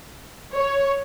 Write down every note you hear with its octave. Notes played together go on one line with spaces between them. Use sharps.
C#5